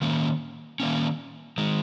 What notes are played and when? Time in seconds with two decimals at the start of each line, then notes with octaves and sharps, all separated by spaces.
0.01 D#3 A#3 C#4
0.80 D#3 A#3 C#4
1.58 D#3 G#3